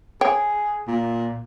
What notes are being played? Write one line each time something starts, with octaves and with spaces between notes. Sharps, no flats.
G#4 C#5 G5
A#2